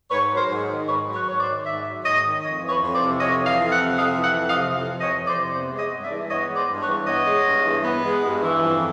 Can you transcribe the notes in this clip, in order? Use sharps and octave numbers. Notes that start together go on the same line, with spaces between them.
G#2 B4 C#5
F#3
A#4 C5
G#2
D#3
G#2 B4 C#5
F#3
B4 C#5
G#2 C#5
C5 D5
D#3
G#2 D5 E5
F#3
G#2 C#5 D#5
D#3
F2 C#5 D#5
E3
B4 C#5
F2
C5 D5
C3
F2 C#5 D#5
E3
D#5 F5
F2
E5 F#5
C3
F2 D#5 F5
E3
E5 F#5
F2
D#5 F5
C3
F2
E3
C#5 D#5
F2
C5 D5
C3
B3 C5 D5
G#3
C#5 D#5
G2
D5 E5
E3
B3 C#5 D#5
G#3
C5 D5
G2
B4 C#5
E3
B3 C#5 D#5
G#3
G2
E3
B3
G#3
G2
E3
F2